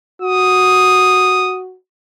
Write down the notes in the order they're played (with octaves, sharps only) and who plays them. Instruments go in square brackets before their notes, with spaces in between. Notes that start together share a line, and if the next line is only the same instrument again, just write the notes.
[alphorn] F#4 [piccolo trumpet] D#6